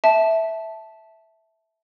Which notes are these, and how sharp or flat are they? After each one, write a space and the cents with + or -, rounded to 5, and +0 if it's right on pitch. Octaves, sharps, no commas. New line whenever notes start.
E5 -10 A5 -10